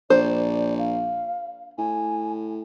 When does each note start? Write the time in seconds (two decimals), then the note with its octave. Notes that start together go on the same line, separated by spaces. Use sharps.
0.10 A#1 C5 D5
0.78 F5
1.78 A2 G#5